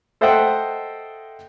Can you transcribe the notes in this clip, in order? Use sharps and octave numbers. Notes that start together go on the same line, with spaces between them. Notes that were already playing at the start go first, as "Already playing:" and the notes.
A4 C5 D#5 E5 F#5 G5